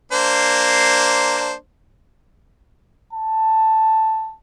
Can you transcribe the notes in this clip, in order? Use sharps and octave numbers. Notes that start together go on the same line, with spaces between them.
A#3 D4 C5
A5